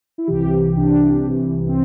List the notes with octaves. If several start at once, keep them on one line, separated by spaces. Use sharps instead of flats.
E4
C2 C3 E3 G4
C2 C3 E3 D4
C2 C3 E3
C4